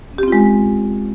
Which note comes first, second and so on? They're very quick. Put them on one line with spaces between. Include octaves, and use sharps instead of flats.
C#4 G4 C4 F4 G#3